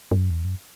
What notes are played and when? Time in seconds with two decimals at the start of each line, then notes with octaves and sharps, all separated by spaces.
0.11 G2
0.16 F#2
0.30 E2
0.45 F#2